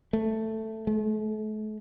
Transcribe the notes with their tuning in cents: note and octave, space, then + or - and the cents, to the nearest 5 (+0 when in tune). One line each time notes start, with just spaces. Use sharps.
A3 +5
A3 -40